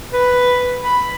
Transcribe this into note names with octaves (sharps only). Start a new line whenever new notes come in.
B4
B5